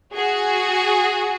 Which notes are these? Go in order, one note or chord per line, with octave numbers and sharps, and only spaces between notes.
F#4 G#4